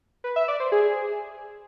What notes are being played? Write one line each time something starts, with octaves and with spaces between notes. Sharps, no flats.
B4
E5
D5
C5
G#4